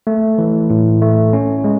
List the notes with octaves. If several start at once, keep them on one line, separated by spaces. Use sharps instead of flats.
A3
E3
A2
A3
C#4
G#3